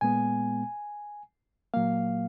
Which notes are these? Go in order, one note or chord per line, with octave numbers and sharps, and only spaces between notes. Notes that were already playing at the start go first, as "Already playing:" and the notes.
A#2 G#3 B3 G#5
A#2 F#3 A#3 F5